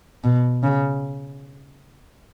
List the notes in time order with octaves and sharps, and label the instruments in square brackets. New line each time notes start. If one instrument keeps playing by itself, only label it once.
[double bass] B2
C#3